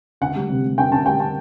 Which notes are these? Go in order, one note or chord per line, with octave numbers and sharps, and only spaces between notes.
D2 F#5
G3
C3
G3
D2 G5
D2 A5
G3 G5
A5